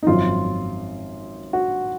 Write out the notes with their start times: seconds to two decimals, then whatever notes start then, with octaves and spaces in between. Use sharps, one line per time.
0.03 D#4
0.07 G#1 F#2 F3 F4
1.53 F#4